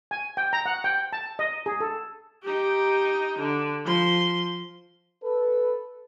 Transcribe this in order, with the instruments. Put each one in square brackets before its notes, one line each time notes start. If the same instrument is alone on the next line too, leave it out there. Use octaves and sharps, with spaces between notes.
[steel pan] G#5
G5
A#5
F#5
G5
A5
D#5
G#4
A4
[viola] D#4 G4
D3
F3 C6
[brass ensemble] A4 B4